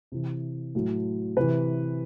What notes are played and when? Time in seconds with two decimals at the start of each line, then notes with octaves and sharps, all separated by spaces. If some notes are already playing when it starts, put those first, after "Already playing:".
0.12 C3 E3
0.75 A2 F#3
1.37 C3 E3 B4